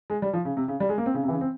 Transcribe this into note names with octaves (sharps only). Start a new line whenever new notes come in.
G#3
G3
F3
C#3
C3
C#3
G3
G#3
A#3
C4
C#3
C3
E3
C#3
C4